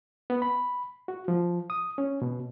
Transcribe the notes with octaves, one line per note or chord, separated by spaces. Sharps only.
B3
B5
F#4
F3
D#6
C#4
B2